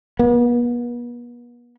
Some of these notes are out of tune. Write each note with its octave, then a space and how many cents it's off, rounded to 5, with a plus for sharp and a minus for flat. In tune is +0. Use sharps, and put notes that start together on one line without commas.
B3 -40